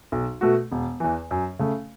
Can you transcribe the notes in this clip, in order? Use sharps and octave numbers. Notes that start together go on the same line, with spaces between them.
B1
B2 A3 F#4
E1
E2 E3
F#2
C#3 A3